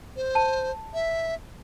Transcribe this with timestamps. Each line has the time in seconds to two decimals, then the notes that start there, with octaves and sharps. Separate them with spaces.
0.16 C5
0.35 A5
0.94 E5